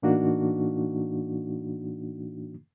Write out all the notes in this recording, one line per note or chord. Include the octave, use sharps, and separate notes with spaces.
A2 E3 A#3 D4 D#4 F#4